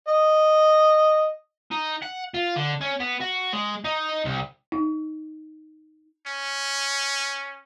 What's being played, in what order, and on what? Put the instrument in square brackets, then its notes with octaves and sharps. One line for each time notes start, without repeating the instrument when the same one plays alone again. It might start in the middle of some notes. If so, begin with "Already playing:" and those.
[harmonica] D#5
[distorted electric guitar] D#4
F#5
F4
D3
C#4
B3
F#4
G#3
D#4
C2
[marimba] D#4
[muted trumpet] C#4